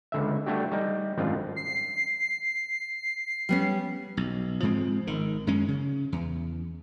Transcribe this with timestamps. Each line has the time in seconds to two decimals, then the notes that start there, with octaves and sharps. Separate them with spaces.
0.12 C#2 D3 E5
0.46 G3 A3 D4 F#4 G4
0.72 G3 D#4
1.17 G#1 F#2 C4 D4 F4
1.56 C7
3.49 G3 B3 C#4
4.17 B1
4.62 G#2 F3 G#3 C4
5.07 G#1 D#3
5.47 F#2 G#3 C#4
5.68 C#3
6.12 E2